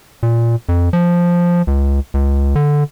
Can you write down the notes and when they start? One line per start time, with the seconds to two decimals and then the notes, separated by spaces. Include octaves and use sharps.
0.23 A#2
0.69 F2
0.93 F3
1.67 C#2
2.14 C#2
2.56 D3